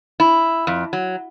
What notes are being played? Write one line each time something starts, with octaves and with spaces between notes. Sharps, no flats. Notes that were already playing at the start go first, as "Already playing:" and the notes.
E4
F2
F#3